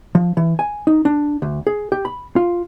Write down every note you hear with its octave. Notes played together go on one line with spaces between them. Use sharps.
F3
E3
G#5
D#4
D4
D2
G#4
G4
B5
F4